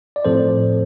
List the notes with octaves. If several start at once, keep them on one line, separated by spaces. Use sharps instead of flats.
D5
A2 F3 C4 A4 C5